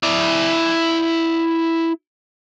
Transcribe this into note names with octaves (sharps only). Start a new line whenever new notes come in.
E4 D5